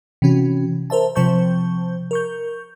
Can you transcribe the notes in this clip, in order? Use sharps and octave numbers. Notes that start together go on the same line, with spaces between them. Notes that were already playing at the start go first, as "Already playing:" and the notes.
C3 E3 C#4 F#4
A#4 C5 E5 A5
C3 F3 C5 A5 C#6 G6
A#4 C#6 G6